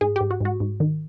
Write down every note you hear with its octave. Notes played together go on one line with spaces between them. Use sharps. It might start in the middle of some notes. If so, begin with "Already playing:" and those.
G#2 G#4
G4
G#2
F#4
G#2 F#4
G#2
D#3